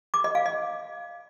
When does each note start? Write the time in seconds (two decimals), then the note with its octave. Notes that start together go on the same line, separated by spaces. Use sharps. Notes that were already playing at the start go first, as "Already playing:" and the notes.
0.14 D6
0.24 D#5
0.35 F5
0.46 D#5